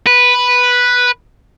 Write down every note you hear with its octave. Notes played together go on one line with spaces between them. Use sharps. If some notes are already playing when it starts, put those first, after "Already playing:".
B4